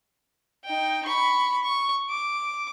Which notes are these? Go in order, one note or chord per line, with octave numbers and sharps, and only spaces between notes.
D#4 G5
B5 C#6
C#6
D6